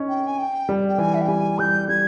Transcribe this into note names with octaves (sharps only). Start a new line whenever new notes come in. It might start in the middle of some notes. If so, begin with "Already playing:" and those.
Already playing: C#4 D#4
G5
G#5
G5
G3
G5
E3 G#5
E5
G5
G3 G#5
G3 G6
G3 G#6